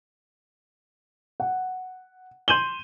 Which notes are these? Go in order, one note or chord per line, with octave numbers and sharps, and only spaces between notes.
F#5
C6 G6 D#7 E7 F#7 G7